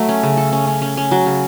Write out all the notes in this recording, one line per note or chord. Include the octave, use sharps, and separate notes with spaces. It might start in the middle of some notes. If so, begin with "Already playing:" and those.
Already playing: F#3 A3
C#4
C#3
A4
C#4
C#4
C#4
C#4
F#3
C#3